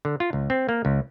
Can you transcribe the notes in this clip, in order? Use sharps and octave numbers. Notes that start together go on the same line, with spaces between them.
D3
F4
C#2
C4
A#3
C#2